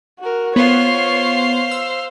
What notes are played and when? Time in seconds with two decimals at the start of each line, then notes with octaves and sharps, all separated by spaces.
0.20 F#4 A#4
0.56 B3 F4 C5 C#5 F5
1.71 E6